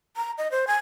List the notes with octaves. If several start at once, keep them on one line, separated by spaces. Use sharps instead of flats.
A#5
D#5
C5
G#5